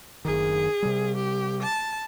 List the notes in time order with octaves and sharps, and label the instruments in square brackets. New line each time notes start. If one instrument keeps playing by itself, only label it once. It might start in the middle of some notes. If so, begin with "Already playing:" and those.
[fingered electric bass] F#1 D#3 [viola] G#4
[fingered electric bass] C3 G3
[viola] G4
A5